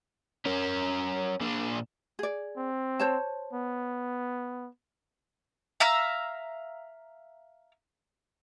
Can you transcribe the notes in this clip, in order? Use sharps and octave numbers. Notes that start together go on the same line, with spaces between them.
C#4 A#4
A#2 D4
G#4 D5
C4
C5 C#5 A5
B3
E5 F5 A#5 E6